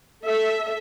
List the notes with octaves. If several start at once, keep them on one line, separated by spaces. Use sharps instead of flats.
A4 E5